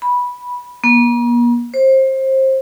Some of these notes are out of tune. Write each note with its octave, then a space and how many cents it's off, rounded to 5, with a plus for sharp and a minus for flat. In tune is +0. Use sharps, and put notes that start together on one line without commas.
B5 -10
A#3 +45
C5 +25